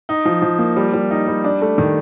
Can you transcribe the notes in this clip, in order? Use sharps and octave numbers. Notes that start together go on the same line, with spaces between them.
D#4
F3
F3
A#3
G3
G3
D#4
G3
D4
A3
D#3